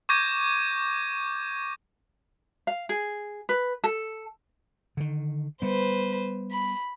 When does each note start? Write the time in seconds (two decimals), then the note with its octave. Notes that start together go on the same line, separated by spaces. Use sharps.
0.09 C#6 D6 G6 G#6 A#6 D#7
2.67 F5
2.89 G#4
3.49 B4
3.84 A4
4.97 D3 D#3
5.62 G3 B3 B4 C5
6.51 B5